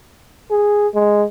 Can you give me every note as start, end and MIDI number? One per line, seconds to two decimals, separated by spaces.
0.51 0.88 68
0.94 1.25 56